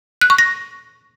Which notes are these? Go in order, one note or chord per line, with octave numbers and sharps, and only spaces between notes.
F#6
C#6
A#6